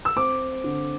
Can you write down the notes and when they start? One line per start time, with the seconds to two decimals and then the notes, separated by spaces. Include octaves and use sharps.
0.05 E6
0.17 C4 D6
0.64 D3